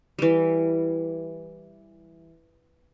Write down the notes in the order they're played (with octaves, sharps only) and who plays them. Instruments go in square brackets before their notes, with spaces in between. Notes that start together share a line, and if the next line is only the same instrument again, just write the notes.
[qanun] E3 G3